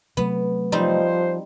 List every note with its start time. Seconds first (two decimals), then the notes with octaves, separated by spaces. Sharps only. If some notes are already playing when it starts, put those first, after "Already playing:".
0.17 C3 F#3 A3 B3
0.72 F3 G3 C4 D#4 C5